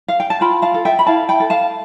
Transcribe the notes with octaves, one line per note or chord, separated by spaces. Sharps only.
F5
G5
A5
F4 G5 B5
F5 A5
A4
E5 G5
B5
E4 F5 A5
G5 B5
A4
F5 A5